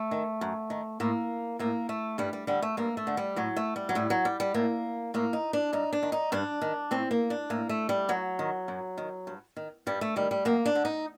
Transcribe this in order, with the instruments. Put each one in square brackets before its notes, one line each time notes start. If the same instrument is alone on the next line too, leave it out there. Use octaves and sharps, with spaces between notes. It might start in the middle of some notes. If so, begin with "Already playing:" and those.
Already playing: [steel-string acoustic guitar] A3
D#3
F#2
D#3
A2 A#3
A2 A#3
A3
G2 G3
G3
D3 G3
A3
G2 A#3
A3
D3
G3
A2 F#3
A3
G3
F#3
A2 G3
F#3
G3
G3
A2 A#3
A2 A#3
D#4
D4
G2 D#4
D4
D#3
D#4
G2 D4
D#3
A2 C4
A#3
D4
A2 A#3
A3
G3
F#2 F#3
D#3
F#2
D#3
G2
D#3
G2 G3
A3
D#3 G3
G3
F#2 A#3
D4
D3
D#4